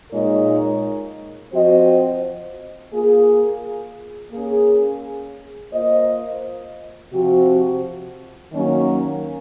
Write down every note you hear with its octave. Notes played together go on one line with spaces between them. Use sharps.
A#2 G#3 D#4 A#4 C#5
F3 C4 F#4 C5 D#5
A#3 F4 G#4
A#3 C#4 G#4
A#3 F4 C5 D#5
C3 F3 C4 F#4
D#3 F#3 A#3 C#4